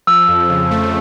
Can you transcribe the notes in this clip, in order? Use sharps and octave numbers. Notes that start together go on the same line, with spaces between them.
F3 E6
F2
C#3
A3